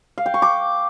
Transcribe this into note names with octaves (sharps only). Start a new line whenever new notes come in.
F5
G5
C#6
D6